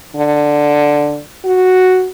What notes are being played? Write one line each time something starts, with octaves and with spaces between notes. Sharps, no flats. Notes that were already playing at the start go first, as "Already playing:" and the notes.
D3
F#4